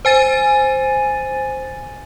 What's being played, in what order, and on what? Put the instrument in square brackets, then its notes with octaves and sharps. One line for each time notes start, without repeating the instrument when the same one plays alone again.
[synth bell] C5 G#5 A6 D#7